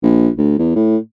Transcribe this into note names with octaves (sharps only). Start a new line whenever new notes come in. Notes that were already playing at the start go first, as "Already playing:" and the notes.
A#1
D2
E2
A2